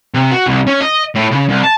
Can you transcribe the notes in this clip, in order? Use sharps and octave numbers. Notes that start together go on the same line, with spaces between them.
C3
F#4
C2
C#4
D#5
A2
C#3
C2
A5